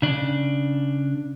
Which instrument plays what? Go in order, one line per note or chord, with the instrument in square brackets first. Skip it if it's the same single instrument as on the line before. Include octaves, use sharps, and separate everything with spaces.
[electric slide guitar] C#3 D4